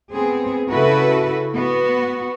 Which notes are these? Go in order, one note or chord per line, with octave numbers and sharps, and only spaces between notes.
B3 C4 G#4
C#3 E4 F#4 A4 B4
B3 F#4